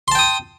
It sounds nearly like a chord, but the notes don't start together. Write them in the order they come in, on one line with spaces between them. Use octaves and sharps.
C6 A5 G5 D#6